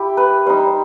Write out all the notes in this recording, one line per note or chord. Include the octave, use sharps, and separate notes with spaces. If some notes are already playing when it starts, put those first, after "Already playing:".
Already playing: E4 G4
B4
G3 D#4 C5